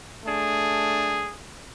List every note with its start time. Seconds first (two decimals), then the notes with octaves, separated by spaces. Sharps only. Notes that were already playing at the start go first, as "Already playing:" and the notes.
0.23 A3 D4 G#4